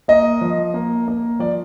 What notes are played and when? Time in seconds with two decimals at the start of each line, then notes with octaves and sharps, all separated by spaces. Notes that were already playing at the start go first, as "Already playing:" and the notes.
0.08 A#3 D#5
0.41 F3
0.74 A#3
1.08 A#3
1.39 F3 D5